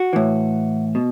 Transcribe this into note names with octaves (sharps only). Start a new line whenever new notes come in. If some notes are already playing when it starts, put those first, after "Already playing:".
Already playing: F#4
A2 E3
B2